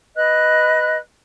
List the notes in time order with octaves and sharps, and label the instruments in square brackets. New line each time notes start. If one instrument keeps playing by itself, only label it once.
[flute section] B4 D#5 F#6